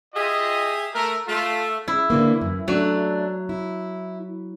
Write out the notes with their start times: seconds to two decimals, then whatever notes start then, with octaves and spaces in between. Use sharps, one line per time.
0.15 F4 G4 G#4 D#5 E5
0.94 A3 A#4
1.28 A3 F4
1.88 E4
2.10 D3 E3 A#3
2.41 F#2
2.68 F#3 A3 D4
3.49 E4